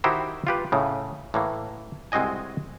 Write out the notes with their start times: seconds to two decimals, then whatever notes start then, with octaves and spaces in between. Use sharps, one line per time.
0.04 D#3 D#4 E4 F#4 G4 C5
0.47 F4 G4 B4
0.72 A2 C#3
1.34 A2 E3 A#3
2.12 C2 G#3 C4 F#4 D#5 G#5